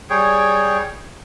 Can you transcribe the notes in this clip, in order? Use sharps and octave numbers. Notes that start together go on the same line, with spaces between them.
G3 G#4 C#5 G5